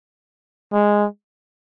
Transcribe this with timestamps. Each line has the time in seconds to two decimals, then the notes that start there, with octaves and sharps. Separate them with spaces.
0.72 G#3